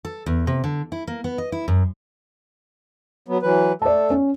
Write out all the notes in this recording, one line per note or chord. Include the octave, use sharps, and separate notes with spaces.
A4
E2
C3
D3
E4
A#3
B3
D#5
E4
F#2
F#3 B3
E3 F#3 B4
A3 A4 D5 A5
C#4